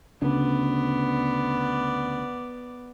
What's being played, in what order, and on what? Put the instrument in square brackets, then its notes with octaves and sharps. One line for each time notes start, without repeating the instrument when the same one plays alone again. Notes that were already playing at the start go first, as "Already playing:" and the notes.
[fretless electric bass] D2 C#3 D4 [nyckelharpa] B3 D5